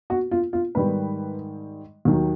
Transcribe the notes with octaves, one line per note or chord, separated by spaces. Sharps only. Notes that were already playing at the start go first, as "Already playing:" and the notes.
F#4
F4
F4
G#2 D#3 G3 B4
D#2 D#3 F#3